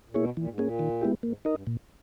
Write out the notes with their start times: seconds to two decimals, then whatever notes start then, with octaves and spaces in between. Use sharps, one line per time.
0.09 A#2
0.14 B2 A#3 E4 G#4 C#5
0.37 A#2 E3
0.48 G#2
0.58 A#2 A#3 C#4 G#4
0.79 D#3
1.01 G#3 B3 E4 G4
1.23 G#2 A#3
1.45 D#4 A#4 D#5
1.53 G2
1.67 A#2